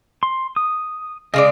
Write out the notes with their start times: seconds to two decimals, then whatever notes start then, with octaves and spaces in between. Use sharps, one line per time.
0.23 C6
0.56 D#6
1.34 C#3 G#3 D5 D#5